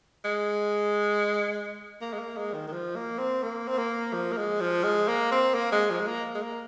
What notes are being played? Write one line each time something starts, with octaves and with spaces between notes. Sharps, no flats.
G#3
A#3
G#3
A#3
G#3
D#3
D#3
F3
A#3
C4
A#3
C4
A#3
F3
A#3
G#3
F3
G#3
A#3
C4
A#3
G#3
F3
G#3
A#3
G#3
A#3